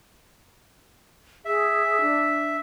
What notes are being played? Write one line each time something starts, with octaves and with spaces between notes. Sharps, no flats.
G#4 E5
D4